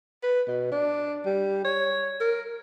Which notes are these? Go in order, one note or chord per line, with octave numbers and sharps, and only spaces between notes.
B4
B2
D4
G3
C#5
A#4